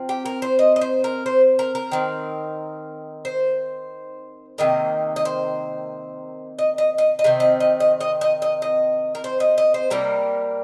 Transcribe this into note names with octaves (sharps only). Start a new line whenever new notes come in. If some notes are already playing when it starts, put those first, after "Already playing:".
Already playing: C3 F3 C4
G4
A#4
C5
D#5
D#5
C5
A#4
C5
A#4
A#4
D#3 C4
C5
C3 D#3 A#3 D#5
D#5
C5
D#5
D#5
D#5
D#5
C3 D#3 C4
D#5
D#5
D#5
D#5
D#5
D#5
D#5
A#4
C5
D#5
D#5
C5
C3 G3 A#3 A#4